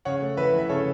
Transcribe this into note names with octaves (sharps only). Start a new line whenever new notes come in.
C#3 C#5 F#5
A3
E3 B4 E5
E3 E5
C#3 A4 C#5